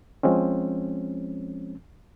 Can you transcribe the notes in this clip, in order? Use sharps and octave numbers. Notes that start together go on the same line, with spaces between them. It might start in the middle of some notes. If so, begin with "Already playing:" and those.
F3 G#3 C4 C#4